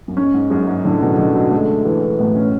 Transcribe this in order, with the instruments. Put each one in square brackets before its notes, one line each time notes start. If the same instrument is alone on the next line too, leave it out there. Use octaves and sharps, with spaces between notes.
[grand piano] F#2
[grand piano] G#2 [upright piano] C#4
[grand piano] G#2
[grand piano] F#2 [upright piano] G#3
[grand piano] G#2
[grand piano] A2 [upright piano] D3
[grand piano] B2
[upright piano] D3
[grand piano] F#3
[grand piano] G#3 [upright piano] A3
[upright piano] E3
[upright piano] A2 [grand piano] B3
[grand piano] C#4